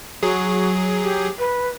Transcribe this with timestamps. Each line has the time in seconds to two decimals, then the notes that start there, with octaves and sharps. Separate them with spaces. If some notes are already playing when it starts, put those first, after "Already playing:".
0.23 F#3 F#4 G#4
1.03 G4
1.38 B4